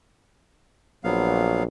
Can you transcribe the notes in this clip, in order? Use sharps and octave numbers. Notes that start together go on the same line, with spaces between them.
A#1 F#3 B3 F5